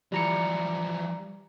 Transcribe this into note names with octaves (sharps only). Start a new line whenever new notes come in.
E3 F3 G3 A#5 C#7